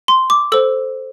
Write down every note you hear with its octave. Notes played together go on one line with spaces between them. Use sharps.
C6
D6
A4 C5 E6